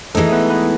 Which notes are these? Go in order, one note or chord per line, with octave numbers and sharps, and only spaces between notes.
E3 G#3 A3 D#4 A4
B3 B4
B3 B4